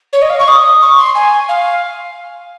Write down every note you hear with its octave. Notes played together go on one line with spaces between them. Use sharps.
C#5
D#5
F5
C#6
D#6
C#6
C6
G#5
F5